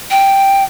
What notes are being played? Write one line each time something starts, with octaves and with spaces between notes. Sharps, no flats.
G5